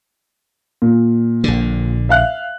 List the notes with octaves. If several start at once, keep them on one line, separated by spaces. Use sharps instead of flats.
A#2
A#1 D3
E5 F5 F#6